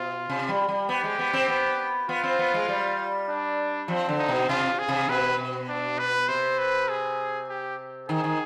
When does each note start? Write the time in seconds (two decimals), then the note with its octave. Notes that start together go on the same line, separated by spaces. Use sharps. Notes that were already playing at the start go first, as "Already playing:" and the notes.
Already playing: B2 F4
0.29 C3
0.49 G3
0.68 G3
0.89 B3 G4
1.04 G#3
1.19 B3
1.33 C4
1.48 B3
2.09 B3 F4
2.24 C4
2.39 B3
2.54 G#3
2.68 G3
3.29 D4
3.88 F3 C4
4.09 D3
4.19 D#4
4.28 B2
4.49 C3 F4
4.79 G#4
4.88 C3
5.09 B2 B4
5.69 D4
5.99 B4
6.28 C3 C5
6.59 B4
6.89 G#4
7.49 G4
8.09 D#3 G#4
8.24 D#3